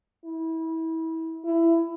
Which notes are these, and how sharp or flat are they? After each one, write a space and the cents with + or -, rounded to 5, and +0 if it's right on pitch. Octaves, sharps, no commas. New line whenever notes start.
E4 -30
E4 +15